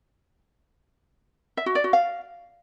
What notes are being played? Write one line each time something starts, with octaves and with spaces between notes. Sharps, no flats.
E5
F#4
D5
F#4
F5